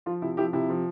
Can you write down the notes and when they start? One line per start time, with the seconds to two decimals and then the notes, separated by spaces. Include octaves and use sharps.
0.06 F3 F4
0.22 C3 E4
0.37 F3 E4 G4
0.53 C3 E4
0.70 F3